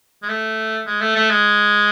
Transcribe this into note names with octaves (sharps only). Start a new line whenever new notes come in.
G#3
A3
G#3
A3
A3
G#3